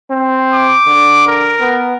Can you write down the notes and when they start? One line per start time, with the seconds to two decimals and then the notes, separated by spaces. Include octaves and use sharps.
0.10 C4
0.54 D6
0.87 D3
1.27 A#4
1.60 B3